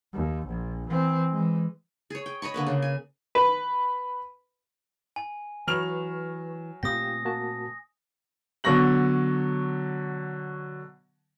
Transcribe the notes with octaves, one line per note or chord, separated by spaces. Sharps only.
D#2
A#1
E3 C4
E3 G#3
G#4 C#5
G5
C#5 D#5 B5 C#6
D3 A#3 B4
C#3
G#5
B4
G#5
E3 F#3 B4 C#6 F6 F7
A#2 A3 C4 F4 G4 G5 D#6 A#6
A#3 F#4 A5
B2 D3 F#3 C#6 A#6 F#7